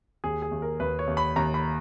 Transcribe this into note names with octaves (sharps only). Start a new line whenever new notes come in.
D#2 G#4
G#4
D#2
A#4
D#2 B4
C#5
D#2
B5
D#2 A#5
B5